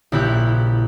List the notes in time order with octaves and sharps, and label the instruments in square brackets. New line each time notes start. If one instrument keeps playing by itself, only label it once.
[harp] A#1 C#3 E4 G4 F#6